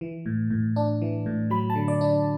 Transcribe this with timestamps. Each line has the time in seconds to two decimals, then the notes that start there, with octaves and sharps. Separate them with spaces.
0.01 E3
0.26 A2
0.51 A2
0.76 D4
1.02 E3
1.26 A2
1.50 F#3 B5
1.70 A5
1.75 D3
1.88 D5
2.01 D4